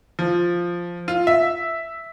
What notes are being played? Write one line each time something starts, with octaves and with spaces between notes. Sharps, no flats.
F3
F4
E5